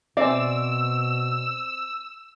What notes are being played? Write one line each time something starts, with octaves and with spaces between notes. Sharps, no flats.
B2 C4 D5 E5 G#5 E6